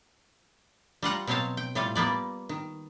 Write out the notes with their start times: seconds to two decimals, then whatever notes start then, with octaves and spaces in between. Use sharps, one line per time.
1.03 G3 F4 F#5 A#5
1.27 B2 F#3 C4 C#5 F5 A5
1.57 G5
1.75 A2 G3 F4 A4 F5
1.95 G3 A#3 B3 D5
2.49 D#3